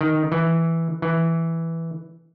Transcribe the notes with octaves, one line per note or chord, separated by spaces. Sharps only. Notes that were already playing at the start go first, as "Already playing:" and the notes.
D#3
E3
E3